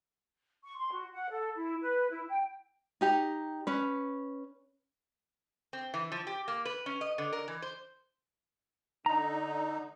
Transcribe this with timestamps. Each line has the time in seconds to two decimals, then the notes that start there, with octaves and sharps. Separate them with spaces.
0.64 C#6
0.77 C6
0.92 F#4
1.12 F#5
1.30 A4
1.56 E4
1.80 B4
2.09 E4
2.29 G5
3.01 D#4 G4 A#5
3.67 C#4 B4
5.73 C4
5.94 E3
6.12 F3
6.27 G4
6.48 A#3
6.65 B4
6.86 C#4
7.01 D#5
7.18 D3
7.33 A#4
7.48 E3
7.62 C5
9.06 D3 D#4 A#5